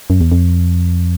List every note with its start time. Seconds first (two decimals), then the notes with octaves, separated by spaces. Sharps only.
0.10 F#2
0.21 E2
0.32 F2